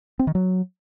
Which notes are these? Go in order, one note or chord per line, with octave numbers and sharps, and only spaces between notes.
C4
D#3
F#3